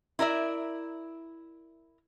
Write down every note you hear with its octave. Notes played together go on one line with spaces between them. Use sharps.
E4 A#4 D5 E5